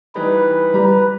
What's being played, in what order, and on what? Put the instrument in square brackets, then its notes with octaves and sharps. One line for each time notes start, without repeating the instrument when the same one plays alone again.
[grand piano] E3 G3 D#4 [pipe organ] B4
[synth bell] G3 G4 [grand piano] A#5